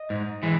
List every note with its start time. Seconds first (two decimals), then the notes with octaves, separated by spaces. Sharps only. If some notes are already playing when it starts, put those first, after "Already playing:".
Already playing: D#5
0.10 G#2
0.43 E3 G#3